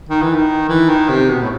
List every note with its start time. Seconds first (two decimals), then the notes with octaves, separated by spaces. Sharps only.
0.09 D#3
0.22 E3
0.35 D#3
0.69 E3
0.89 D#3
1.09 C3
1.29 B2
1.42 A2